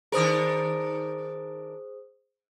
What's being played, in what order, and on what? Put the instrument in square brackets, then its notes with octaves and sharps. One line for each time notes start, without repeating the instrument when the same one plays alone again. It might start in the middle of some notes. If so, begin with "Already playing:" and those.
[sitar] D#3 D4 A#4 [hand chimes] G#4 C5 D#6